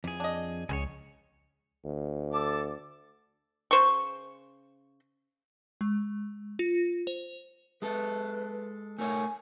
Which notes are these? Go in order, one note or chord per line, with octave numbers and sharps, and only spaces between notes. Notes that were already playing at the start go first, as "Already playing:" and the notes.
F2 E3 G#4
D4 D#5
C#2 G#4 C5 C#5
D2
A4 A5 D6
C#3 C5 C#6
G#3
F4
C5
G#3 A4 B4
A3 A#4 C#5 G#5